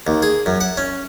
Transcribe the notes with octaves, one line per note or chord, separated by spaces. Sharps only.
D#2
G#4
F#2
F#5
C#4